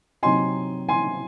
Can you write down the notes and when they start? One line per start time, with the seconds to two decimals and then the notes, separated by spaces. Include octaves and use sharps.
0.23 C3 F#3 C4 D#4 G#5 C6
0.89 G#5 C6